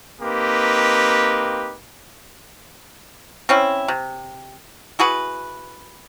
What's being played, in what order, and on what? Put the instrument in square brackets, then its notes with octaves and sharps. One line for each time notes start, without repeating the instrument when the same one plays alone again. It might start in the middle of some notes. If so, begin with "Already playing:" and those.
[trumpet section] A#3 C4 D#4 G4 B4
[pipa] C4 C#4 E4
C3
E4 F#4 G#4 B4